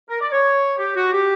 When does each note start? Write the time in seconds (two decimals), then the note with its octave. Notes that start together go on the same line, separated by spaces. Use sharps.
0.09 A#4
0.21 D5
0.32 C#5
0.78 G4
0.96 F#4
1.13 G4